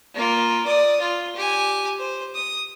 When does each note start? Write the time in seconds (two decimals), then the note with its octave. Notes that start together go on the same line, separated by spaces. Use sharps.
0.15 A#3 F4
0.66 D5 D#6
1.00 F4
1.36 G4 G#5
1.99 C5
2.35 D#6